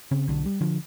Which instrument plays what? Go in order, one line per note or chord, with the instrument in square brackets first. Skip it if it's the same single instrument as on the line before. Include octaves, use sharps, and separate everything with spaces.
[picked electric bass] C#3 C4
B1 D3 D4
G3
D3 F3